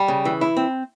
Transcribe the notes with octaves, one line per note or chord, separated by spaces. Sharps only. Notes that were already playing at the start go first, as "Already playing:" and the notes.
Already playing: G3
C#3
E3
E4
C4